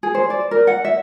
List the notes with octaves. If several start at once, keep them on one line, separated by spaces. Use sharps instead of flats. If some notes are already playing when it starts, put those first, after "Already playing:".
G#4
C5
D5
A#4
F#5
E5